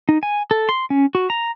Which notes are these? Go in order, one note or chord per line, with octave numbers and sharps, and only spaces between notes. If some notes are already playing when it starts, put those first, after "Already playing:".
D#4
G#5
A4
C6
C#4
F#4
A#5